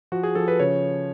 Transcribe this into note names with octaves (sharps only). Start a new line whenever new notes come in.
F3 F#4
G#4
F3 A4
B4
C#3 C#5